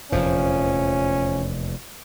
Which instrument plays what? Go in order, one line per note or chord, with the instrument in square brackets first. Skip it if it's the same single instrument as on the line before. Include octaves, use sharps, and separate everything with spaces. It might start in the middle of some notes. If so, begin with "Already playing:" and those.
[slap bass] F1 E2 A#2 [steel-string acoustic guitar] F3 [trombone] C#4